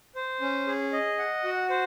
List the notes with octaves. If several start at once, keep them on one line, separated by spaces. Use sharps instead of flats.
C5
C#4
G#4
D#5
F#5
F#4
C5